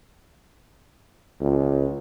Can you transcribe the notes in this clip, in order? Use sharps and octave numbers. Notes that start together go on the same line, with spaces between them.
C#2